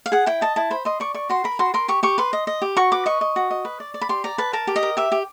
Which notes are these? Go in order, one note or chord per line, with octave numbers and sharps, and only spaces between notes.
F5
G#4 F#5
E4 G5
D#5 A5
E4 A5
C5 B5
D#5 C6
D5 C#6
D5 C#6
F#4 C6
A#4 B5
F#4 C6
A#4 C6
G4 C#6
G4 C#6
B4 C6
D#5
D#5
G4
F#4 C#6
B4 D6
D#5 C#6
D#5
F#4
D#5
B4
D5
D5
B5
G4 C6
D5 A#5
B4 A5
A#4 A5
G4
D#5
A#4
G4 E5
G4